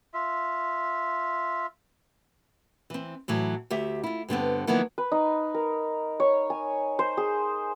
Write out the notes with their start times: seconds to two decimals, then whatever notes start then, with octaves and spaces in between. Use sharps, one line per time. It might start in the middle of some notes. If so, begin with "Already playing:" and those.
0.14 F4 E5
2.90 E3 C4
3.28 A2 E3 F#3
3.70 D2 G4 E5
4.03 E4 F4
4.29 G2 D3 B3 C4
4.67 D#3 F3 F#3 A#3 B3 E4
4.98 B4
5.12 D#4
5.54 A#4
6.20 C#5
6.50 G#5
6.99 C5
7.17 G#4